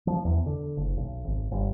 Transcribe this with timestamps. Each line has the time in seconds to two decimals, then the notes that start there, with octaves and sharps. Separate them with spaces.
0.07 F3
0.25 E2
0.46 D3
0.77 F#1
0.97 B1
1.24 G#1
1.51 G1